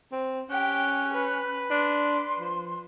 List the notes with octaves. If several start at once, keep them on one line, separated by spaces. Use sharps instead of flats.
C4
C#4 G4 G5 F#6
B4
D4 C6
F3